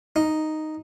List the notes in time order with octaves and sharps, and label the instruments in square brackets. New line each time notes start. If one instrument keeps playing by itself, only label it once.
[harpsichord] D#4